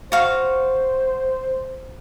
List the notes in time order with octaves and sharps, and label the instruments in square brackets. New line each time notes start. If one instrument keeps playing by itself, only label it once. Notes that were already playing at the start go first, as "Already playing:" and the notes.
[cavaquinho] F#4 F5 C#6 [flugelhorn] C5